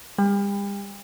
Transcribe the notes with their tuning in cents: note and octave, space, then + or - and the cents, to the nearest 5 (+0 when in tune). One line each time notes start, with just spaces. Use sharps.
G3 +40